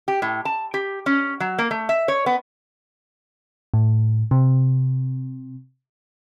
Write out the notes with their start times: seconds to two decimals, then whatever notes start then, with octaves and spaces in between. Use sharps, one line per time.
0.08 G4
0.22 A2
0.45 A5
0.74 G4
1.06 C#4
1.40 F#3
1.58 A#3
1.71 A3
1.89 E5
2.08 C#5
2.26 B3
3.74 A2
4.31 C3